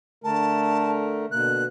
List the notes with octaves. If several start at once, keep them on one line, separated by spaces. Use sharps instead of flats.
D3 A3 A#4 A5
B2 D3 A#3 F#6